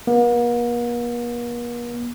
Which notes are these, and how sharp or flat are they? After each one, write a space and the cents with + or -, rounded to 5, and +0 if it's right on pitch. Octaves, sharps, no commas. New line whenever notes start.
A#3 +45